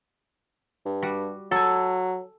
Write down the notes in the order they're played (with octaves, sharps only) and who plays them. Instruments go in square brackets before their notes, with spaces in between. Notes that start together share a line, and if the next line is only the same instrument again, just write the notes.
[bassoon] G2
[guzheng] G3 F#4
[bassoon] F#3 [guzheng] A4 G#5